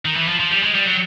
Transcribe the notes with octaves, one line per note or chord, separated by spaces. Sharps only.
D#3
E3
F3
F3
G3
G#3
G3
F#3